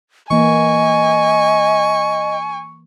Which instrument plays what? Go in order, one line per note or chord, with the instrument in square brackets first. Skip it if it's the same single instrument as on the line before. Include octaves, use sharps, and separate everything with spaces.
[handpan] E3 A#3 [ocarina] D#5 [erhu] G#5 [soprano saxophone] C#6